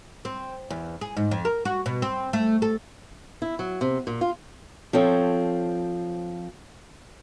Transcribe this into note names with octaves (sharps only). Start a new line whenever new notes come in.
C4
E2
G#4
G#2
F2
A#4
F#4
B2
C4
A3
A4
E4
F#3
C3
A#2
F4
F3 C4 A4 C#5